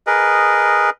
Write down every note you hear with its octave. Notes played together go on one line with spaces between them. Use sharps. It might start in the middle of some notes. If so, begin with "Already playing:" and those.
G#4 A#4 B4 D#5